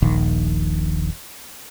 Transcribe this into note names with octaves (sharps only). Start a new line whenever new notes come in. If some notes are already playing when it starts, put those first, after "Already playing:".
D#1 A#1 D#3